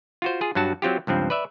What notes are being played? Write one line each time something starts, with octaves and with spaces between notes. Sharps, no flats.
F4 F#4 C5
F4 G#4
G2 F#3 F#4 A5
F#3 C4 F4 G4
C#2 G2 F3 C4
B4 D5 E5